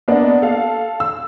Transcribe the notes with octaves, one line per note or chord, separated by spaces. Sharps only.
A#3 B3 D4 D#5 F#5
A4 F5
E6